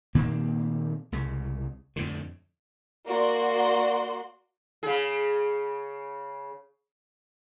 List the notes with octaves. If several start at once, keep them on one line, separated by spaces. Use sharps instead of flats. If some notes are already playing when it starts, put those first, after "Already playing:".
A#2 D#3 A#3 C4
C2 C#3
F2 A2 D3
A#3 F#4 D5 C6
C#3 G#4